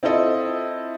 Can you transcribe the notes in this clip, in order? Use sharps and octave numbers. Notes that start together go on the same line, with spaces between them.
C4 E4 F4 A4 D#5